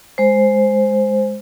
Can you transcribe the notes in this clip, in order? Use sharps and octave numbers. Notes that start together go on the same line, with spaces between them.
G#3 C5